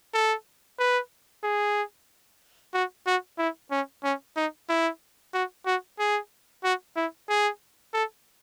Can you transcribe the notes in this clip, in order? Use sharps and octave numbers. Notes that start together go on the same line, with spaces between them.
A4
B4
G#4
F#4
F#4
E4
C#4
C#4
D#4
E4
F#4
F#4
G#4
F#4
E4
G#4
A4